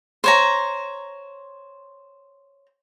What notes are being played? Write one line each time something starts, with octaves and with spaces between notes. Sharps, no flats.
C5 C#5 A#5